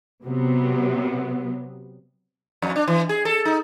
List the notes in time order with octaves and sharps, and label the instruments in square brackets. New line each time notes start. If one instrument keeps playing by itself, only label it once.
[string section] C3 F#3 B3
[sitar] F2
D4
E3
G#4
A4
D#4